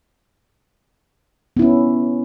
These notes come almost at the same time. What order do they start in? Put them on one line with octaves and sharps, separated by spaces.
B3 E4 C#4